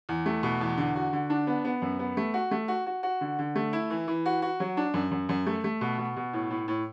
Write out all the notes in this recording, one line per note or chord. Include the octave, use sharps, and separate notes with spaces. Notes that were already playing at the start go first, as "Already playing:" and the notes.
E2
A3
B2
E2
D3
F#4
D3
D4
B3
B3
F#2
B3
A3
F#4
A3
F#4
F#4
F#4
D3
D3
A3
E4
E3
E3
F#4
F#4
F#3
D4
F#2
F#2
F#2
A3
A3
B2
B2
B2
A2
A2
A2